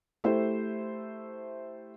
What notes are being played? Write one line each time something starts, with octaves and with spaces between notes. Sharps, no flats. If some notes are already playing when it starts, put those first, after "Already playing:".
A3 E4 G4 C5